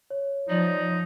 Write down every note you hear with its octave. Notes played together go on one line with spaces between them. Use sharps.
C#5
F3 D#4 D5